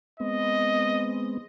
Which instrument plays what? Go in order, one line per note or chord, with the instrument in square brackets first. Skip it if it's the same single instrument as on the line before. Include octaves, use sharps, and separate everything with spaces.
[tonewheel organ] G#3 B3 C4 [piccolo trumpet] D#5